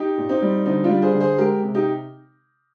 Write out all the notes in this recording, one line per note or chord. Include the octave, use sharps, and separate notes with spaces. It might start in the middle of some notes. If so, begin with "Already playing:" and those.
Already playing: D#4 G4
A#2
C4 D#4
G3
D3 C4 D#4
D4 F4
G3
G#4 C5
D3
G#4 C5
G#3 G4 A#4
C3
D#4 G4